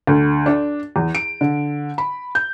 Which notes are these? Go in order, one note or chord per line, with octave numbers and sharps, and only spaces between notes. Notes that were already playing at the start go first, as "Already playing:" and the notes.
D2
D4
E2
D7
D3
B5
G6